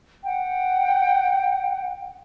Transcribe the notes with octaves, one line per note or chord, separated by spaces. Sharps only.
F#5 G5